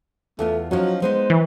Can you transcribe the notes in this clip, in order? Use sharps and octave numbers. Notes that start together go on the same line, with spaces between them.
E2 A3 B3 F4
F3 F#3 C#4 D#4
G#3 B3 D#4 C5
E3